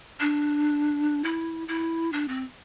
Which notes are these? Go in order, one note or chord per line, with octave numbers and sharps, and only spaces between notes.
D4
E4
E4
D4
C4